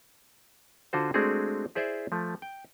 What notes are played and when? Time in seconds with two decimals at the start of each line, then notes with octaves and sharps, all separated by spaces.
0.93 D3 F4 F#4 C5
1.14 G#3 A3 C4 D4 F#4 G#4
1.75 E4 G#4 C5 D5 E5
2.12 F3 A3
2.42 G5